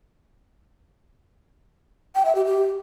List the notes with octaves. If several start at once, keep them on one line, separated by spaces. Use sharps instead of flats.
G5
E5
G4
G4